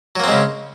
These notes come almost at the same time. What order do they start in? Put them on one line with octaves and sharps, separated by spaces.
F#3 A#3 C4 G#3 C#3